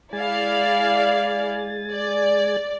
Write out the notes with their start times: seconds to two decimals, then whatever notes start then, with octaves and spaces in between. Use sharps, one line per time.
0.13 G#3 E4 D5 F5 G#5 A6
1.92 D5